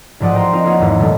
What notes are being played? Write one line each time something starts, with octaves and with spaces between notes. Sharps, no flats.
A1 G#2 F3 D5 F#5 D#6
C5 G5 A#5 C6
C4 D#4 F4 A#4
A#3 D#4 F4 C#5 F5 F#5
G#1 E2 G#2
A#2 D#3 G3 A3